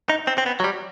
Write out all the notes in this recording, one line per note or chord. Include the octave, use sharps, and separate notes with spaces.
D#4
C4
C4
B3
F#3
G3